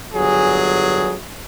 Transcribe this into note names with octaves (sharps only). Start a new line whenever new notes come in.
G1 F#3 G#4